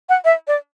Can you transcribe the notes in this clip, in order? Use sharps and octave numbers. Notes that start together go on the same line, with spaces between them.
F#5
E5
D5